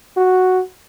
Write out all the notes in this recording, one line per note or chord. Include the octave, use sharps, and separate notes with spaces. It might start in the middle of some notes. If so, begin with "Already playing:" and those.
F#4